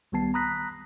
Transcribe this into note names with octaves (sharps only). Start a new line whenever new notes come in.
C2 D#3 G3 B3 A5 C7
A#5 B5 D#6 F#6 A#6 B6